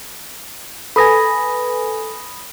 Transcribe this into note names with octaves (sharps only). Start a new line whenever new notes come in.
A4 B4 G#5 B5 D#6 A#6